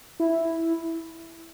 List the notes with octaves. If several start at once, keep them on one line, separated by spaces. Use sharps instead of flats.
E4